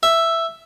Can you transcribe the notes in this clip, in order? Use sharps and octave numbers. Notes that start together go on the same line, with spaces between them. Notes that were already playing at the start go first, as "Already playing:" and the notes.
E5